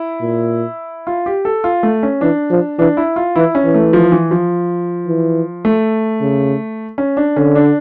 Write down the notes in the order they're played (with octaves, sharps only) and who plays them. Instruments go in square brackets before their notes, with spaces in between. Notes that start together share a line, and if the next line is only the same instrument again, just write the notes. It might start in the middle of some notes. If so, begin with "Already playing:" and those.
Already playing: [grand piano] E4
[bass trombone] A#2
[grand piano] F4
G4
A4
F4
A3
C#4
[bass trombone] E3 [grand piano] D4
[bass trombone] F3
[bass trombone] E3 [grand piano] D4
[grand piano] E4
F4
[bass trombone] E3 [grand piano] E4
[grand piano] C#4
[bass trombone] E3
[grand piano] A3
F3
E3
F3
[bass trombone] E3
[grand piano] A3
[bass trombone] C#3
[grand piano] C#4
D4
[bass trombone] D3 [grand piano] C#4
[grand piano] D4